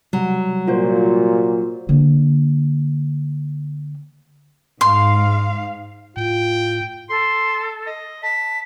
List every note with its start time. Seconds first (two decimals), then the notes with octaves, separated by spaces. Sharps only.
0.13 C3 F#3 G3
0.68 A#2 F4 F#4 C5
1.89 D3 A#3
4.81 G#2 F5 C6
6.17 A2 F4 G5
7.10 A4 C6
7.87 D#5
8.23 A5 B6